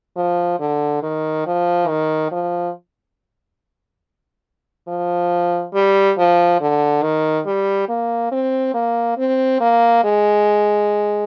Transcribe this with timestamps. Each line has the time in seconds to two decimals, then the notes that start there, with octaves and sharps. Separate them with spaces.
0.16 F3
0.59 D3
1.03 D#3
1.46 F3
1.88 D#3
2.31 F3
4.88 F3
5.74 G3
6.18 F3
6.61 D3
7.02 D#3
7.46 G3
7.88 A#3
8.31 C4
8.74 A#3
9.17 C4
9.60 A#3
10.04 G#3